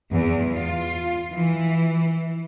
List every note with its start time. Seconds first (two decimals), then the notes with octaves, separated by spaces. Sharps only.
0.11 E2
0.55 F4
1.34 E3